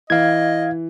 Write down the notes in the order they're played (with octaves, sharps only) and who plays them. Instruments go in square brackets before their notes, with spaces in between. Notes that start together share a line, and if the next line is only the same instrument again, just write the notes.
[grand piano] E3 [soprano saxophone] D#5 [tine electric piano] F5 G#6